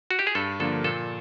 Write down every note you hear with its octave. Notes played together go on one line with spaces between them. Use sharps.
F#4
G4
G#4
G2 A4
D3 F3 A#3 D4 A4
A#2 A4